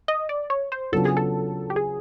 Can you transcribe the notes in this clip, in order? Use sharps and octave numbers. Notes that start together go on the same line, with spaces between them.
D#5
D5
C#5
C5
C#3 F#3 B3 D4 F4 A4
G#4
A4
G4
G#4